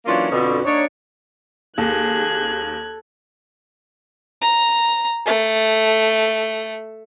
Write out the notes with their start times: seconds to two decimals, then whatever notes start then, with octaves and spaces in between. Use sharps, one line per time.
0.06 E3 F#3 A#3 C#4 D4 F4
0.31 F2 B2 D3
0.65 A#3 D4 D#4 C#5
1.78 D#2 G#4 A4 F#6 G#6
4.41 A#5
5.26 A3